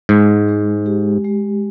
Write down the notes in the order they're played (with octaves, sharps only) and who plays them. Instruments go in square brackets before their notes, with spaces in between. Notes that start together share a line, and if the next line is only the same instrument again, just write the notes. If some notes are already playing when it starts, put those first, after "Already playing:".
[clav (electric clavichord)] G#2 [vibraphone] G#3
[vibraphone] G#3
G4
G#3